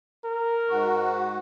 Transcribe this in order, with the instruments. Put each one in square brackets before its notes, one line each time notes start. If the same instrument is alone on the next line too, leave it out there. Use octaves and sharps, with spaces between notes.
[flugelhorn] A#4
[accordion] G#2 F#4